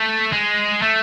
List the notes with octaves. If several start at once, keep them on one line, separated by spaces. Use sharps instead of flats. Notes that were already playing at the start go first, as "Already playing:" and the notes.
Already playing: A3
G#3
A3